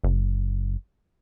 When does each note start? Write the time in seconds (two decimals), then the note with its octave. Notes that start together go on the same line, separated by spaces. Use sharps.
0.03 F#1